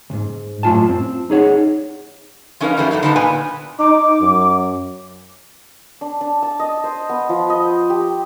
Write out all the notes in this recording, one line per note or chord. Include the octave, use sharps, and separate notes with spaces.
D2 G#2
F#2 A2 F4 G#5 A5
C4
D#4 G#4 C#5 F#5
F3 C#4 D#4 A#4 B4 F5
F#2 E3 G3 A3 A#3 F#4
F#3 D#4 F#4 A4
D3 A#3 D#4 B4 A5
A#2 B3 B4 G#5
D#4 D6
F#2
D4
D4
A5
D#5
C5
B3
F3
D#5
C5
G4